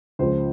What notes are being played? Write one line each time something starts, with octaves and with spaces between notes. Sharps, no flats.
C#2 C#3 F3 C5